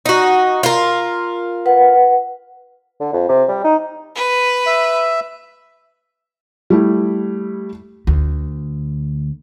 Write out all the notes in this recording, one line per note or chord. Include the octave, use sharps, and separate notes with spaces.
D#4 F#4
F4 A#4
B4 F#5
D3
F2
C3
G3
D#4
B4
E5
G3 A3 E4
D2